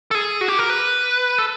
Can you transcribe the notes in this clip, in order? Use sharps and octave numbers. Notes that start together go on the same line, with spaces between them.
A4
G#4
F#4
G4
A#4
B4
A4